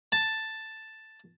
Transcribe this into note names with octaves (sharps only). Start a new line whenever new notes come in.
A5